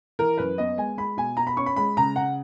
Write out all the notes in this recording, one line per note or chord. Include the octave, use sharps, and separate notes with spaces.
E3 A#4
F#2 B4
B3 D#5
G#3 G#5
G#3 B5
B2 G#5
B2 A#5
B5
C#4 C#6
B5
G#3 B5
C#3 A#5
C#3 F#5